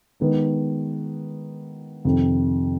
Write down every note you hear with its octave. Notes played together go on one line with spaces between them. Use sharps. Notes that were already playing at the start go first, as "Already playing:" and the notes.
D#3 G#3 B3 D#4
F2 C3 D#3